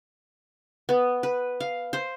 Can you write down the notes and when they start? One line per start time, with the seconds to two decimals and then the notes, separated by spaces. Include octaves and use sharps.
0.89 B3
1.23 B4
1.60 F5
1.93 C5